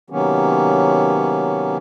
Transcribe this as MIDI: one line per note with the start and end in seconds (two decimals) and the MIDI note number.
0.10 1.77 48
0.10 1.77 51
0.10 1.77 54
0.10 1.77 58
0.10 1.77 59
0.10 1.77 61